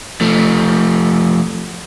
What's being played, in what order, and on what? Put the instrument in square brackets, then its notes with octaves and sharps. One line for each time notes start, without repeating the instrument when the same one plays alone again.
[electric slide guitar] F3 A3